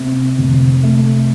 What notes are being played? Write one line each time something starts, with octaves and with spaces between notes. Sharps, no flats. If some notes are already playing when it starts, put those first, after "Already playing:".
Already playing: C3
F1
A3